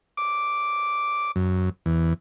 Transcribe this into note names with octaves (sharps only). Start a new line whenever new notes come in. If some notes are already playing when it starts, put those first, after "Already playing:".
D6
F#2
E2